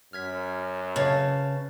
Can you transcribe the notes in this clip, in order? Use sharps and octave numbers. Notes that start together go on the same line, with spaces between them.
F#2 F6 G#6 B6
C#3 B4 A5 A6